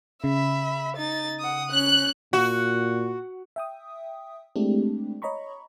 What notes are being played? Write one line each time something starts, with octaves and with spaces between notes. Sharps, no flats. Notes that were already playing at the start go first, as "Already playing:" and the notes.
C#3 E5 B5
D#4 A6
F#5 D#6
C#4 F#6
A#2 F#4
E5 G5 D#6
G#3 A3 C4 D4 E4 G4
C#5 D#5 A#5 B5 C#6